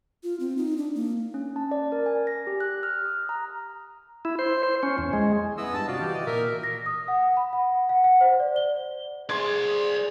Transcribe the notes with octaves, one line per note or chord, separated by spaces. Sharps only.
F4
C4
D#4
D4
A#3
C#4
A5
D5
A#4
G#5
A#6
G4
F#6
F6
D#6
A#5
E4
C5
C5
C#4
E2
G#3
B3 E4 D#5 E6
G2 A5
C3 F4 F#4 D5
E3 G4
D#5
A#2 A#3 A#4 E5
A#6
D#6
F#5
B5
F#5
F#5
F#5
C5
D5
G7
G#4 C5 D5 C6 G#6